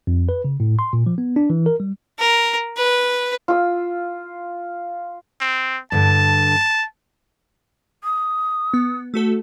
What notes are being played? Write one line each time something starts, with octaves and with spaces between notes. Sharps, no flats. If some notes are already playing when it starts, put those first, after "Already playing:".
F2
B4
C#3
A2
C6
A#2
F3
B3
D4
E3
A#4
G3
A#4
B4
F4 E6
C4
G2 D3 A5
D#6
B3
A3 F#4 A4